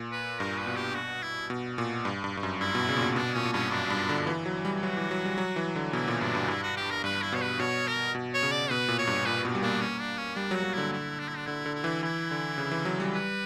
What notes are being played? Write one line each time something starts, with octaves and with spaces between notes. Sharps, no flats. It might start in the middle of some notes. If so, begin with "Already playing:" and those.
Already playing: A#2
B4
G2 A#4
B4
B2
G4
F#4
E4
B2
A#2
G2
G2
G2
F#2
G2 E4
B2
C#3
A#2
B2
B2 D4
A#2 C#4
A#2
G2 C#4
F#2 D4
G2
D3
E3
F#3
G3
F#3 F#4
E3
F#3
G3
F#3
E3
D3
B2 E4
A#2
G2 D4
G2
G2 E4
F#4
G4
A#4
G2 B4
E4
B2 C#5
B4
B2 C#5
A#4
B2
C#5
C#3
D5
B2 B4
A#2
C#5
G2
A#2 B4
B2
G3
A#3 D4
C#4
D4
C#4
G3 D4
F#3
F#4
F#3
D3 E4
E4
D4
E4
D4
D3 E4
D3
E4
E3
E3 E4
D3
C#3
E3
F#3
G3
B4